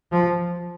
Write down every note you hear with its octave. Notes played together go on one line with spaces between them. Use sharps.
F3